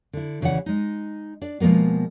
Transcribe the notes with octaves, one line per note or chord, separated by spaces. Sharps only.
D3 E4
D#2 C#3 E3 D5 F#5
G#3 D#4
D4 D5
B2 F3 G#3 A#3 B3